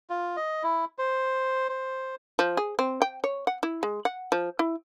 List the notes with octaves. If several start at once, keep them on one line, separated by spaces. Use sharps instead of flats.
F4
D#5
E4
C5
C5
F3
G#4
C4
G5
C#5
F#5
E4
G#3
F#5
F3
E4